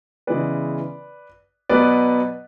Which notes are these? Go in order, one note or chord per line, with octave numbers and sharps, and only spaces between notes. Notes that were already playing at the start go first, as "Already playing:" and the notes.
C#3 E3 G#3 B3 B4 D5
B2 F#3 B3 B4 D5